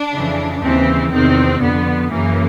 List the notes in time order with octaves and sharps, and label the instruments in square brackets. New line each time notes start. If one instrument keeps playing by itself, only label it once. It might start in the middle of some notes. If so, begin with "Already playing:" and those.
Already playing: [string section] D4
F2 C#3 E3
D#2 C#3 E3 C4
E2 C3 D#3 C4
F2 D3 B3
F#2 C#3 E3 A#3